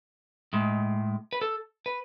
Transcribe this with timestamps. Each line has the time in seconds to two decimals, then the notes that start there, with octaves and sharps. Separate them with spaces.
0.53 A2 G#3
1.33 B4
1.42 A4
1.86 B4